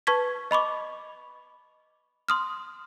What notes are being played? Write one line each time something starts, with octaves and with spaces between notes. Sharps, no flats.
B4 A5 C#6 G#6 B6
D#5 B5 C#6 D6
C6 D#6 F6